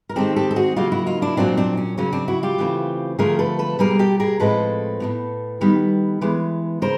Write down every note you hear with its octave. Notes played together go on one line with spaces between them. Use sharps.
A#4
D#3 G#3 C4 G4 A4
G4 A4
A4
F#4 G#4
C#3 F#3 A#3 F4 G4
E4 F#4
D#4 F4
D4 E4
A#2 F#3 A#3 C4 D4
C4 D4
C#4
C#3 F#3 A#3 C#4
C4 D4
E4 F#4
F4 G4
C#3 E3 A3 C4
D3 F3 A3 C4 G#4 A#4
A4 B4
A4 B4
B2 G3 A#3 G#4 A#4
G4 A4
G#4 A#4
A2 F3 G#3 C4 A4 B4
A2 F#3 B3
D#3 G3 B3
E3 G#3 B3
C#3 A#4 C5